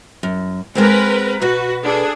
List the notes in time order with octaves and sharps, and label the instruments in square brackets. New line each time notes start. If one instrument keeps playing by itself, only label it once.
[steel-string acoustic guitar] F#2
[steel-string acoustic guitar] G#3 B3 C4 [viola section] A#4 B4
[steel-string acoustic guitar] B2 B4 [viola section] F#4
[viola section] D4 G#4 A4